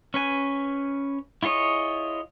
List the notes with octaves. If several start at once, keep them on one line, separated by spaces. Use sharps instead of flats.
C#4 B4 G#5
E4 F4 G#4 C#5 D#5